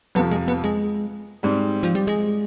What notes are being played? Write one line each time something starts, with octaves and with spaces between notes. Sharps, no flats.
F2 C3 F3 B3
G#3
B3
G#3
G#2 G3 C4
F3
G3
G#3